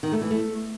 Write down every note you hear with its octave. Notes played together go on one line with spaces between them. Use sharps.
D#3
A3
E3
A3